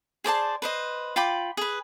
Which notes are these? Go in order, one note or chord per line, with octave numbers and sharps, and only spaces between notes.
G#4 C5 D5 A5
B4 C5 D#5
F4 G5 B5 D6
G#4 B4